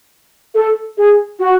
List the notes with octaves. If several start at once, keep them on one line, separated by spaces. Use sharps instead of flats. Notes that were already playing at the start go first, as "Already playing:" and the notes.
A4
G#4
F#4